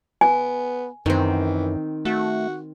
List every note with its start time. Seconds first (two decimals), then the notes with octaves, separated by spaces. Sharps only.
0.21 B3 G#5
1.06 F#2 D#3 E3 C4
2.05 A3 F#4